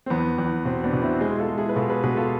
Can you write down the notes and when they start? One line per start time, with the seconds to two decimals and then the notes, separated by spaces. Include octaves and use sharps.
0.06 C4
0.10 E2 B3
0.38 E2
0.65 B2 C4
0.84 B3 D4
0.93 B2
1.02 C4 E4
1.20 G#3 E4 G#4
1.39 F4 A4
1.48 G#3
1.58 E4 G#4
1.69 B4
1.76 B2 F4 A4
1.90 G#4 B4
2.04 B2 G#4 B4
2.17 F4 A4